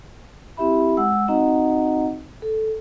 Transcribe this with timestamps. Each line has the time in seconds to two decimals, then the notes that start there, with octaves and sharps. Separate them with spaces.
0.57 C4 E4 G4 E5 B5
0.97 G#3 F#5 E6
1.28 C4 D#4 F#4 D#5 F#5 A#5
2.42 A4